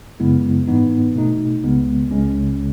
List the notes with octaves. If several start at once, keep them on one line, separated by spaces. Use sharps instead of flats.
F#2 C#3 G#3 B3 E4
G#2 E3 B3 D#4
B2 A3 D#4
C#2 C#3 G#3 B3
C#2 C#3 G#3 C#4